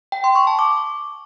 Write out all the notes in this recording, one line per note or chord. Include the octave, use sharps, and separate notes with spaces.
G5
C6
C#6
A5
D6